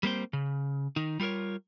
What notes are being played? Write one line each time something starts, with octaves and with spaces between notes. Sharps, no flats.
G3 A#3 C4 C5
C#3
D#3 D#4
G3 F4 A4 A#4 C#5